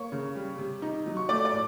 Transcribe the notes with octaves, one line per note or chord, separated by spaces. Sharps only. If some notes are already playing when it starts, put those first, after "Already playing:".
Already playing: A#3 C#5 C#6
C#3
G3
C3
D#4
F#3
C#6
A3 D5 D6
D5 D6
A2